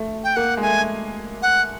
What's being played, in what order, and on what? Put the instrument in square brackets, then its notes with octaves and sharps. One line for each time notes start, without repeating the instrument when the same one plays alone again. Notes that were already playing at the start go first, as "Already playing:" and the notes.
Already playing: [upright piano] A3
[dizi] G5
[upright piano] A#3 [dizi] F#5
[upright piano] G#3
[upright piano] A3 [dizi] G#5
[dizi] F#5